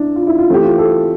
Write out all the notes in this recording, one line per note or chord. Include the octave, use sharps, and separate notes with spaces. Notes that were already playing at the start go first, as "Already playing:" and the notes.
Already playing: D4 E4
F4
E4
F4
E3 A3 C4 G4
F4
A4